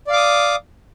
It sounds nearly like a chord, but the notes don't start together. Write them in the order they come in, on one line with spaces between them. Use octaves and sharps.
D5 F5 D6 D#6